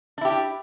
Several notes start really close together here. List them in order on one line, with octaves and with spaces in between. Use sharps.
D4 E4 G4